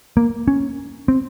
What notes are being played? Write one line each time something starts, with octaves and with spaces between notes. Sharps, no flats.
A#3
C#4
C4